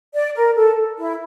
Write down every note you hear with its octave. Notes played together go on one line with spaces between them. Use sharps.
D5
A#4
A4
E4